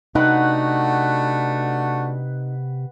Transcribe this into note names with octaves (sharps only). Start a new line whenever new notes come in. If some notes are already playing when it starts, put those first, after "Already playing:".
C3 A3 D4 D#4 F#4 B4 F#5 G5